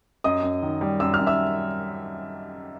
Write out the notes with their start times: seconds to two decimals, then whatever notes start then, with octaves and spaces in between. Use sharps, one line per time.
0.24 F#2 D#5 D#6
0.43 F#2
0.62 D#3
0.81 G3
1.00 F#2 E6
1.14 F6
1.19 F#2
1.27 E5 E6